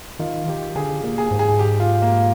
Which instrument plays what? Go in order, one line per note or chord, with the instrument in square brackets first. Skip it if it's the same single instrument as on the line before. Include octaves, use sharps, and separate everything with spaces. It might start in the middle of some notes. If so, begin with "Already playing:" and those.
[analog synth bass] D#3 [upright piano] F4
[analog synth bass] D#3 [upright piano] G4
[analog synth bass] D3 [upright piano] G#4
[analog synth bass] A#2
[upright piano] G#4
[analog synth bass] G#2
[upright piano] G#4
G4
F4
A#3